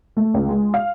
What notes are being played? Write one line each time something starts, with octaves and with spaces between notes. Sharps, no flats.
A3
C#2
G#3
F5